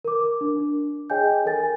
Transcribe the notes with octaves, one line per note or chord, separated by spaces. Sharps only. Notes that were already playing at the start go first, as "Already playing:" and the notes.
A#4 D6
D4
G#4 C#5 D#5 G5 G#5 G6
A4 A#4 G#5 A6